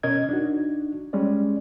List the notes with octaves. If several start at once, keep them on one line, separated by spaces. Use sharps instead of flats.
B2 C#4 A#4 D#5 G#6
D4 D#4 F#4
G3 G#3 C#4 D5